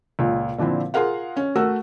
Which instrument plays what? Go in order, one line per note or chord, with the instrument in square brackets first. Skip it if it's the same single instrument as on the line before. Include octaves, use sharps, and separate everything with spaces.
[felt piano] C#2 A#2
A#2 D3 F3 C4 E4
F4 G#4 A#4 F5 F#5
C#4
A3 F#4 A#4 E6